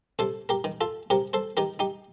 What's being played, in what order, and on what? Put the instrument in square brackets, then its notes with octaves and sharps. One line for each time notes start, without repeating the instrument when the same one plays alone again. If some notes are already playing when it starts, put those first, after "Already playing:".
[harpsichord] C3 A4 C5
G4 A#4
D#3
F4 A4
C3 G4 A#4
A4 C5
D#3 G4 A#4
D#4 G4